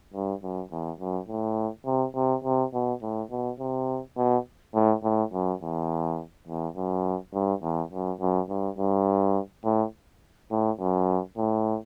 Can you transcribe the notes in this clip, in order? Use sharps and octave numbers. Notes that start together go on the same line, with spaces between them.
G2
F#2
E2
F#2
A2
C3
C3
C3
B2
A2
B2
C3
B2
A2
A2
F#2
E2
E2
F#2
G2
E2
F#2
F#2
G2
G2
A2
A2
F#2
A2